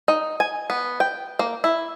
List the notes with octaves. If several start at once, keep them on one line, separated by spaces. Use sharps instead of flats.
D#4
G#5
B3
G5
A#3
E4